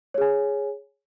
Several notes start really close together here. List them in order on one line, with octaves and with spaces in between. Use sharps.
C#5 G#4 G#5